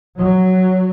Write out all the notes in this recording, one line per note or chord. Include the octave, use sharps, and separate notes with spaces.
F#3